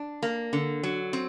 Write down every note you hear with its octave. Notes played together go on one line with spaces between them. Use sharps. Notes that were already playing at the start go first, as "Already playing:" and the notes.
Already playing: D4
A#3
D3
F#3
C4